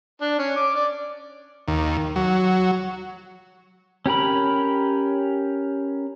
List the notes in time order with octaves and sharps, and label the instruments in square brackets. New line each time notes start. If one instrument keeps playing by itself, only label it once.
[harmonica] D4
C#4
D6
D5
[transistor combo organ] D#2
F#3
[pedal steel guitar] C#4 G4 A#4 B5